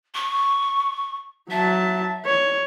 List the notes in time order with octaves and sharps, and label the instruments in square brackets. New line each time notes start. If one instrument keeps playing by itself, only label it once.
[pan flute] C#6
[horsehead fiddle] F#3 A5 [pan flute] E5
[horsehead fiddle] C#5